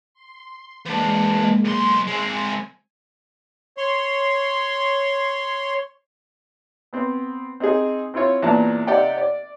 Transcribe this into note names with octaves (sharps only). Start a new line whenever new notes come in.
C6
E3 G#3 A#3 D4
B1 G#5 C6
G#3 C4
C#5 C6
B3 C4
C4 D#4 G#4
C4 E4 F4 C#5
E2 A#2 D4 A5 A#5
C3 D#4 G4 D5 F#5 G5
D5